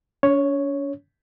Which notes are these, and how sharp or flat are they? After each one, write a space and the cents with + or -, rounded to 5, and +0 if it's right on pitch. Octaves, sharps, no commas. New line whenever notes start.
C#4 +45 C#5 +0